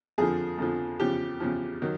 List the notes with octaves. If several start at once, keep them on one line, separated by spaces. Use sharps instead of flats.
F2 D3 F3 G#4
F2 D3 F3
E2 C#3 F3 G4
E2 C#3 F3
D#3 F#3